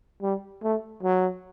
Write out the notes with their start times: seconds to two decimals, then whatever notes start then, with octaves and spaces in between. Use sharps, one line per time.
0.22 G3
0.63 A3
1.03 F#3